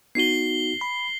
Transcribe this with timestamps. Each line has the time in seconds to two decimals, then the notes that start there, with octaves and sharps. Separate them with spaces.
0.15 B3 D#4 F#4 C7 G7
0.81 B5